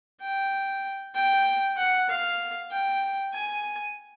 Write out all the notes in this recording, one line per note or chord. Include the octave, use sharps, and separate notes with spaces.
G5
G5
F#5
F5
G5
G#5